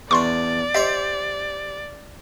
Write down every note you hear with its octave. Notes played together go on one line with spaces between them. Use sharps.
E2 D4 D5 C6 C#6
G4 C5 D#5 E5